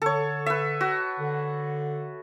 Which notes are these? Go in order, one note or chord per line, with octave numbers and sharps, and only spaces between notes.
D3 A4 C#5
B4 E5
F#4
D3